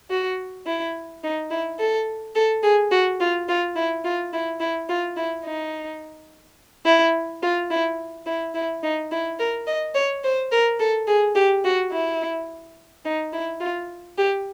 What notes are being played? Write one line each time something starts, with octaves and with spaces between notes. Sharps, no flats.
F#4
E4
D#4
E4
A4
A4
G#4
F#4
F4
F4
E4
F4
E4
E4
F4
E4
D#4
E4
F4
E4
E4
E4
D#4
E4
A#4
D#5
C#5
C5
A#4
A4
G#4
G4
F#4
E4
D#4
E4
F4
G4